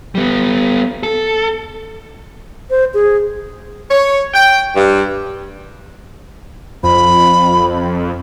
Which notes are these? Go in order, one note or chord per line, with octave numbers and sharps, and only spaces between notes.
G3 B3
A4
C5
G#4
C#5
G5
G2
F2 F3 B5